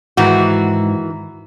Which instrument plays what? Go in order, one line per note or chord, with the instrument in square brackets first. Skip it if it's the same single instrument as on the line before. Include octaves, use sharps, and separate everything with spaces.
[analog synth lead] G#2 [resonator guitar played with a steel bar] D#3 E3 F#4